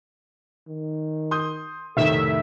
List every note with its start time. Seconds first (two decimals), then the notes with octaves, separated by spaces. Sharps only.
0.68 D#3
1.31 C6 D#6 G6
1.97 F1 A2 D#3 A4 E5